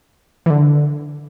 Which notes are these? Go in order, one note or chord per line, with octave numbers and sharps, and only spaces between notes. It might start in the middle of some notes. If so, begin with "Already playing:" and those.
E3
D3